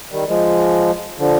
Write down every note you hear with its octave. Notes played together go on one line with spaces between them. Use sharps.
D#3 G3
F3 G#3
D3 F3